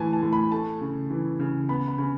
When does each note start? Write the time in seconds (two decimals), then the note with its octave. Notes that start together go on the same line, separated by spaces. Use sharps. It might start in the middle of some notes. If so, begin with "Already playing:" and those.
Already playing: A2 E3 G#5 A5
0.13 A5
0.22 A2
0.33 B5
0.52 A3 A5
0.81 C#3
1.10 E3
1.40 C#3
1.69 B3 B5
1.88 B5
1.98 C#3